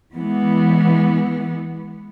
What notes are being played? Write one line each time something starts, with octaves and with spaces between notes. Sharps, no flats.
E3 G#3 B3